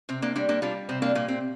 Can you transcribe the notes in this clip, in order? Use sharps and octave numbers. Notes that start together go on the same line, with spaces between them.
C3 C4
A#3 D4
G3 A#3 D4
A#3 D4
G3 D4 F4
C3 C4
A#3 D4
A#2 A#3
C4